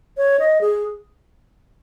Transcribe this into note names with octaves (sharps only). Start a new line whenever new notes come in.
C#5
D#5
G#4